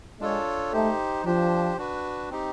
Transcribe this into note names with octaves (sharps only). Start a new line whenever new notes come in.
G#3 D4 F4 A4 C#5
A3 D#4 G4 C5
F3 D4 G4 C5
D4 F#4 B4
C4 D#4 G4